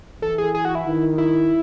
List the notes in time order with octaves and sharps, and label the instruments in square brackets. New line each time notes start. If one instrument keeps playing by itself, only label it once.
[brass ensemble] E3 [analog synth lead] A4
[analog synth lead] G#4
G#4
F#4
E4
[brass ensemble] D#3
[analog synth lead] E4